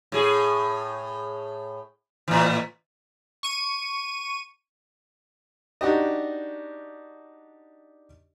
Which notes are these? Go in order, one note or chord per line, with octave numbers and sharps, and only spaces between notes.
A2 G#4
A2 E3
C#6 D#7
D4 D#4 F#4 G4 D#5